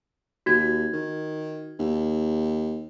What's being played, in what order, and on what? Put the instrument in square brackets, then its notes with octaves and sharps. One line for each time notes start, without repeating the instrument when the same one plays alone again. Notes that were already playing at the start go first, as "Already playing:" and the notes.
[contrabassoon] D#2 [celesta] F#4 G#6
[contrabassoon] D#3
D#2